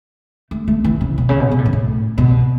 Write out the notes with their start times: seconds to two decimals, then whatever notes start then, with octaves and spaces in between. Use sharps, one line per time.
0.51 A3
0.68 A3
0.84 E3
1.01 C#3
1.18 B2
1.29 C#3
1.40 B2
1.51 B2
1.58 A2
1.66 F#2
1.73 A2
2.18 B2